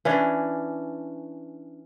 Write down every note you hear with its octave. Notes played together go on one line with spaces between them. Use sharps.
E3 C#4 D4